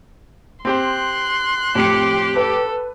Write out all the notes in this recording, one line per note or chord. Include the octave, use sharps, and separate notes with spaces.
C4 G4 C5 C6 F#6
F2 A2 G4 C#7
A4 B4